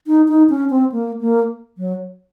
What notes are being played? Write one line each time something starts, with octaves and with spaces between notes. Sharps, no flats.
D#4
D#4
C#4
C4
A#3
A#3
F#3